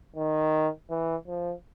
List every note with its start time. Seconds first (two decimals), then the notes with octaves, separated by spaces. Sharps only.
0.16 D#3
0.90 E3
1.27 F3